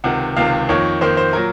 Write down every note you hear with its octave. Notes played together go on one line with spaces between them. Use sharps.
C#2 C3 D#3 F#5
C#2 C3 D#3 F5
F2 D#3 A#3 C#5
F2 D#3 A#3 C5
C5
A#2 F#3 A#3 A#4